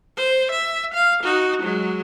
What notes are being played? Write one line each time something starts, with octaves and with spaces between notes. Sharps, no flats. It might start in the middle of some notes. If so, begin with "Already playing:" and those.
C5
E5
F5
D#4 F#4
F#3 G#3